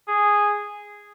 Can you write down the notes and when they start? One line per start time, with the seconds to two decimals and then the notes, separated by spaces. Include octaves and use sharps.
0.08 G#4